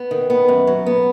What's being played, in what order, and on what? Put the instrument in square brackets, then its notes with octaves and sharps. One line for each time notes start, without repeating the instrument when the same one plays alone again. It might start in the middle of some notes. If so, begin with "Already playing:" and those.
Already playing: [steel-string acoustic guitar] B3
D#3
B3
F#2
F#3
B3